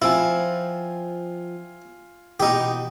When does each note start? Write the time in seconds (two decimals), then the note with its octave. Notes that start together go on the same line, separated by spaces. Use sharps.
0.02 F3 C4 E4 F4 G#5
2.40 B2 E3 D#4 G4